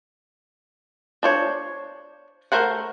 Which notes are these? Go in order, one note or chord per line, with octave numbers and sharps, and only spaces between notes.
D4 C5 C#5
A3 A#4 C5 F#5